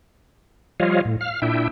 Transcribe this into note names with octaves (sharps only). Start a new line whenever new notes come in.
F3 G3 F4 C#5 D#5 F5
A2
F5 F6
A#2 D4 E4 E5 G5